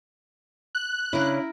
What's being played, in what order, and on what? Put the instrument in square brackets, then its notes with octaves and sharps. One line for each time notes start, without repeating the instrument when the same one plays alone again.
[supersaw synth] F#6
[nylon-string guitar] C#3 D4 [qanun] E4 A#4